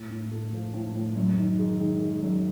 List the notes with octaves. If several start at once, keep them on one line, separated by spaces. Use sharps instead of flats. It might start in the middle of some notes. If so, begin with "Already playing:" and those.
Already playing: A2
A2
A3
F3
A2
A2
F#2
D#3
G#3
D#3
G#3
F#2